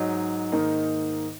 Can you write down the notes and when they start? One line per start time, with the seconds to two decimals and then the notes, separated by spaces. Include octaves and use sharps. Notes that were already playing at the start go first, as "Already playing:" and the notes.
Already playing: G#2 F#3 D#4
0.52 G#2 D#3 A#3 D#4